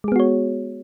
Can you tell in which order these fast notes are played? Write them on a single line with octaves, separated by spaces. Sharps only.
G#3 G#4 B3 F#4 C#5